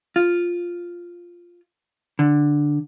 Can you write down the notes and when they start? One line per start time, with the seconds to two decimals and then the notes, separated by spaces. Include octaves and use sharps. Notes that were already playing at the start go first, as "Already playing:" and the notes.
0.16 F4
2.19 D3